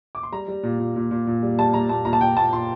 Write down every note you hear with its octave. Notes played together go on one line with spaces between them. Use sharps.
D6
C6
G3 A#5
G3
A#2
A#2
A#2
A#2
A#2
G3
G3 A5
G3 A#5
A#2 A5
A#2 A#5
A5
A#2 G5
A#2 A5
A#2 C6